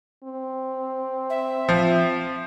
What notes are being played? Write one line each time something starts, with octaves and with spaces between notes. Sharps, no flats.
C4
E5
F3